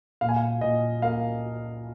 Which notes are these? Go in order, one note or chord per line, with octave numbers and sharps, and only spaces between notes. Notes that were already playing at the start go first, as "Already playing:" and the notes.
A#2 F5
G#5
F5
A#2 D#5
A#3 F5